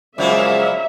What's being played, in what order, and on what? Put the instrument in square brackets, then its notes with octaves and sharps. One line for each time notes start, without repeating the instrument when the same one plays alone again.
[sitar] C#3 F#3 A#3 [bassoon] F3 [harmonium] G#3 G#4 D5 [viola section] E5